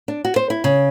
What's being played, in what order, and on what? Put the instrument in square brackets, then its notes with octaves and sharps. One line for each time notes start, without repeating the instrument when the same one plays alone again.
[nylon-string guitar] D4
F#4
C5
E4
C#3